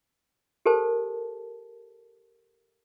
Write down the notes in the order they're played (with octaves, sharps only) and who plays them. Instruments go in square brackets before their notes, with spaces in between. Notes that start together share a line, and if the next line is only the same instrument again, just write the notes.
[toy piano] G4 A4 A#4 C5 A5